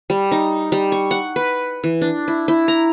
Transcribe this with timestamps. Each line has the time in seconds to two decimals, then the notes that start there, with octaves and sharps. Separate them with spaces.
0.10 G3
0.31 D#4
0.72 G3
0.92 C#6
1.11 F#5
1.36 B4
1.84 E3
2.01 D4
2.28 E4
2.48 E4
2.68 A#5